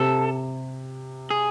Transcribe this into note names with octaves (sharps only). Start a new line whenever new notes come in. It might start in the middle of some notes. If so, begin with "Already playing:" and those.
Already playing: C3 A4
G#4